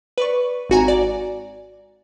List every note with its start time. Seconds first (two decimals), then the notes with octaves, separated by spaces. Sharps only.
0.18 B4 D5 C#6
0.70 G#1 F#4 G#5 A#5
0.88 D5